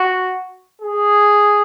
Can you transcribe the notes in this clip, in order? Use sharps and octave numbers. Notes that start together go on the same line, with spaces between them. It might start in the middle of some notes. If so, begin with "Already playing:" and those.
Already playing: F#4
G#4